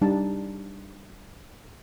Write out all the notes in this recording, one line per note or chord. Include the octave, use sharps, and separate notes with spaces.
G3 D4 D#4 A5